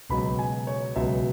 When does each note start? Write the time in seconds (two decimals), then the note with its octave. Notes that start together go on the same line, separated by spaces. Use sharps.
0.09 C#2 B2 F#3 B5
0.39 G#5
0.67 C#5
0.96 C#2 B2 F#3 E5